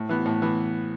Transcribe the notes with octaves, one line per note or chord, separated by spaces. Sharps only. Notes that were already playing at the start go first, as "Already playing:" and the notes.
Already playing: A2
E3 B3
A2
E3 B3